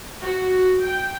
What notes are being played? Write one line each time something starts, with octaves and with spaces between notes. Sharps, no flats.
F#4
G5